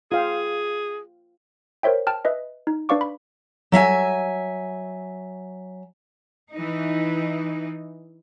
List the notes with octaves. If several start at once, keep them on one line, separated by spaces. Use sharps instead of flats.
F4 G#4 F5 G5
A#4 C5 C#5 E5 G5
G5 A5 F6
B4 D#5 E5
D#4
D4 B4 D5 F5 C#6 D6
B5
F#3 E5 F5 G#5
E3 D#4